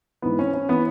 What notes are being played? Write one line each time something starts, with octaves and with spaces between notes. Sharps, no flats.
G#2 E3 B3
C#4
C#4
E3 B3